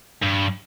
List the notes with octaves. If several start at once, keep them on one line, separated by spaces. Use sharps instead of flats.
G2